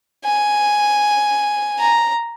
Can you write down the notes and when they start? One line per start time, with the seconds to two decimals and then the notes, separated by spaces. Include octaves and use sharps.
0.25 G#5
1.79 A#5